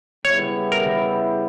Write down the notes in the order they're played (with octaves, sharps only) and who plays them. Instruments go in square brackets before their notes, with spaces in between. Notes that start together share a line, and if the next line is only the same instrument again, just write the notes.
[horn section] C#3 G3 B3 E4 [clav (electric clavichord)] C#5
[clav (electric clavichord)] A#4